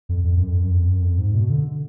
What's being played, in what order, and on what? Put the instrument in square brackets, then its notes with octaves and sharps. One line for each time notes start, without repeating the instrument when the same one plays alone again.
[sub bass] F2
F2
F#2
F2
F#2
F2
F#2
F2
G#2
B2
D3